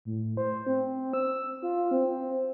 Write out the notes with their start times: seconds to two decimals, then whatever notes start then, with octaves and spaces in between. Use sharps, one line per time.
0.05 A2
0.37 C5
0.67 C4
1.14 E6
1.62 F4
1.91 C4